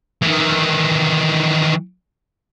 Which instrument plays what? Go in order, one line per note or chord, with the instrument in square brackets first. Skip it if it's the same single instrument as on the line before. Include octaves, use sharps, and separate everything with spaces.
[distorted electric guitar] D#3 E3